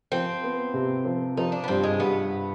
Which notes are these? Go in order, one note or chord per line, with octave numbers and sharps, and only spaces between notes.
F3 C4
B3
C3
F3
F3 D#4
D4
B3
G2 C4
G#3
G2 B3